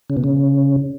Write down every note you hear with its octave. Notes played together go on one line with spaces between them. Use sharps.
C#3
B2
C#3